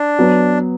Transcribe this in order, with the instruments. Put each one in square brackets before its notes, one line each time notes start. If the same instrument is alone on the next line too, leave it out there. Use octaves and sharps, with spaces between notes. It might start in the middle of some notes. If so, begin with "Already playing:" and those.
Already playing: [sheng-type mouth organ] D4
[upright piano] F#3 B3